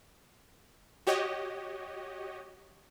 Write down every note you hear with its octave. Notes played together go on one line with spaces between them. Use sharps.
F#4 G4 C#5 D#5